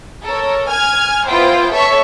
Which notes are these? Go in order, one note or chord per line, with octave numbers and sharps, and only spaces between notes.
A4 A#4 C#5
G#5 F6 G#6
B3 E4 F4 C5 G5
A4 C#5 E5 C#6